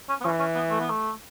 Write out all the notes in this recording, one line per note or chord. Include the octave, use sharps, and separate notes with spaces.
C#4
B3
E3 C#4
C#4
B3
A3
B3
A3